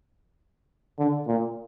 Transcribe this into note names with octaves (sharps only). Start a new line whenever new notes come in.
D3
A#2